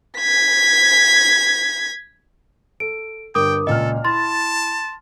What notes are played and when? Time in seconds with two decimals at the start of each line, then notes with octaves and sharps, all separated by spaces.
0.18 G#6 B6
2.80 A4 D7
3.35 G1 G2 A#4 G5 D6 D#6
3.67 C#2 A#2 A4 D#5 F6
4.04 E4 A5 C6 A6